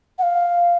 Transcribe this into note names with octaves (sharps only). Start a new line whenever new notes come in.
F#5
F5